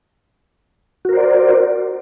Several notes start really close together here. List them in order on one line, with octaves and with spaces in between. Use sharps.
F#4 A#4 C5 D5